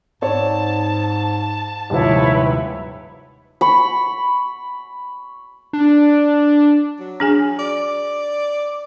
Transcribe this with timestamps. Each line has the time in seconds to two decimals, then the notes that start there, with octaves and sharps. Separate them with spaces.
0.22 G#2 C4 C#5 D5 A5
1.90 D#1 G#2 C3 F3 E4 B4 C#5
3.61 B5 C#6
5.73 D4
7.00 F#3
7.20 D4 G#4 G#5
7.59 D5